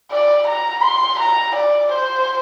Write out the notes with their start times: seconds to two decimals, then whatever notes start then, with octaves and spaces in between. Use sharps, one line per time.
0.12 D5
0.48 A#5
0.83 C6
1.20 A#5
1.56 D5
1.92 C5